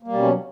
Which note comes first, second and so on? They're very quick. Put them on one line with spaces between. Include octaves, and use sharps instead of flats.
A#3 G3 B2 C#4 F#3